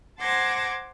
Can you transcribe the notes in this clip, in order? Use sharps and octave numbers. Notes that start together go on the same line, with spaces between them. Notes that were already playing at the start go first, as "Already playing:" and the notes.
C5 F#5 A5 D6 G#6 A#6